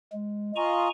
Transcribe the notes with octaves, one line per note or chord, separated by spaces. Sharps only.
G#3
F4 D#5 G#5 A#5 C#6